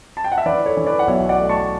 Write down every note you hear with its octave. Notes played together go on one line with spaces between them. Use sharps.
A5
G5
F#5
E5
E3 B4 D5
A4 C#5
E3
B4 D5
F#5
B1 C#5 E5
D5 F#5
A3
A5 C#6